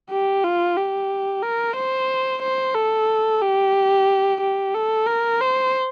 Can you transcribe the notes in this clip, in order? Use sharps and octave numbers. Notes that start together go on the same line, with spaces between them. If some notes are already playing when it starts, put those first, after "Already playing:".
G4
F4
G4
A#4
C5
C5
A4
G4
G4
A4
A#4
C5